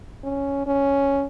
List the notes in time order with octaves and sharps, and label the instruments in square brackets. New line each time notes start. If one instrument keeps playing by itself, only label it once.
[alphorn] C#4
C#4